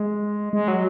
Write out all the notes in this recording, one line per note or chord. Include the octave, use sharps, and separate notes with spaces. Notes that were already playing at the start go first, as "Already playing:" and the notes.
Already playing: G#3
G#3
F#3